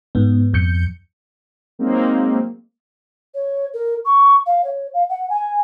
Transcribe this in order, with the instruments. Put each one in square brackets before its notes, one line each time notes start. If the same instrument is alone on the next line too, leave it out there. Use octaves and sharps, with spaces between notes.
[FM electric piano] G#2 B3
F2 G6 C#7
[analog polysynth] F#3 G#3 A#3 C4 D#4
[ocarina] C#5
A#4
C#6
F5
C#5
F5
F#5
G#5